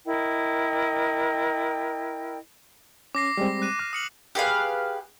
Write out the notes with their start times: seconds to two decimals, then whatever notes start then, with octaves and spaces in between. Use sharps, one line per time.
0.06 E4 A#4 D#5 G5
3.15 C#4 D6 A#6 C7
3.37 G3 G#3 C4
3.62 F#6 D#7 E7
3.79 D6 F6
3.93 D#6 C#7 F#7
4.35 G4 G#4 B4 F5